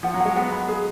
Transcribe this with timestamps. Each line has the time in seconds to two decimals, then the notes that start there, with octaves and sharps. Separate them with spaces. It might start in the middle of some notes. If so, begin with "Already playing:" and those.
0.03 F3 F#5
0.14 F#3
0.20 F#5
0.25 G#3
0.36 B3 F#5
0.52 B5
0.68 G#4